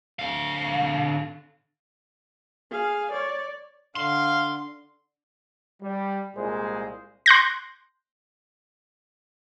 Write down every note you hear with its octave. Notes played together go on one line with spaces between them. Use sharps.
D3 F5
G#4 F5
C#5 D5
D3 F5 C6
G3
C2 A#2 G#3 G#4 C5
C6 F#6 G6 A#6